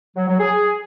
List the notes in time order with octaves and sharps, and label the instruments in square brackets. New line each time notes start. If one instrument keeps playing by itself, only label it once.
[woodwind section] F#3
F#3
G#4